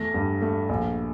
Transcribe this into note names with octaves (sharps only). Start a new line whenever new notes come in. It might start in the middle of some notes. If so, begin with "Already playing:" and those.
Already playing: E2 A3 A#6
G2
A3
A#1